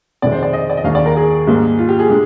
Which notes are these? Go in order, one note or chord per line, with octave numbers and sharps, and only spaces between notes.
F2 C3 D#3 G#3 D5
C5
D5
D#5
D5
D#5
D#2 D#3 G#3 F5
D5
A#4
G#4
G#2 G3 A#3
F4
G4
G#4
D3 G#3